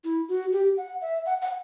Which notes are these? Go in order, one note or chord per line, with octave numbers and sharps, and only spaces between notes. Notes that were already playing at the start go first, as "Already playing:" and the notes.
E4
F#4
G4
F#5
E5
F#5
F#5